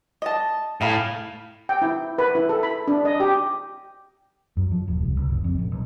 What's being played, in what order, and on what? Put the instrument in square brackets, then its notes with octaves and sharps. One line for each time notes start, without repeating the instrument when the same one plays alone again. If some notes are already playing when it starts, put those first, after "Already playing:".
[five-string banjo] D#5 A5
[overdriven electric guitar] A2 [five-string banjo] G#4 F5 B5
[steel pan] G5
E4
B4
E4
A4
B5
D4
D#5
G4
[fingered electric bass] F#2
F3
D#1
C2
C#2
F#1
F2
A#1
B1